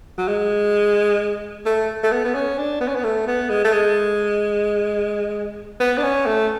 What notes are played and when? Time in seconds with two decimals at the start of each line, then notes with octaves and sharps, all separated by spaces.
0.18 F#3
0.28 G#3
1.66 A3
2.03 A3
2.12 B3
2.25 B3
2.35 C#4
2.58 D4
2.81 B3
2.88 C#4
2.96 B3
3.04 A3
3.27 B3
3.49 G#3
3.65 A3
3.73 G#3
5.80 B3
5.98 D4
6.03 C#4
6.26 A3